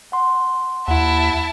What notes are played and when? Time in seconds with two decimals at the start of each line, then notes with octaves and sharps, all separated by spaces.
0.12 F#5 C6
0.88 D#2 E4 F#5 A5